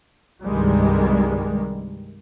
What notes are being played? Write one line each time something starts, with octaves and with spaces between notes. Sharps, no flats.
C2 G2 D#3 G3 G#3